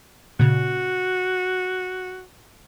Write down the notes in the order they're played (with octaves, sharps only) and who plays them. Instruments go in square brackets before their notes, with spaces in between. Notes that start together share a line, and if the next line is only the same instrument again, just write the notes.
[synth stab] A#2 C#3 [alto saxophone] F#4